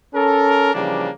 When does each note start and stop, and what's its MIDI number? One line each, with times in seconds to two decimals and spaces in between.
0.14 0.73 61
0.14 0.73 69
0.14 0.73 70
0.74 1.09 49
0.74 1.09 52
0.74 1.09 53
0.74 1.09 55
0.74 1.09 58
0.74 1.09 62